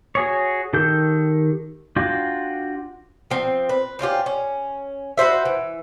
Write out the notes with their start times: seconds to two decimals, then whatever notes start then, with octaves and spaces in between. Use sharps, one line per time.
0.15 F#4 G#4 C#5
0.73 D#3 G4 A4 G6
1.96 D4 F4 F#4 G5
3.30 F3 C4
3.69 B4
3.99 C4 C#4 F4 G4
4.26 C#4
5.18 F#4 B4 C5 E5
5.45 E3